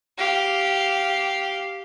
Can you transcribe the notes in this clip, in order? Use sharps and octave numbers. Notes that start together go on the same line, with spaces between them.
G4 F5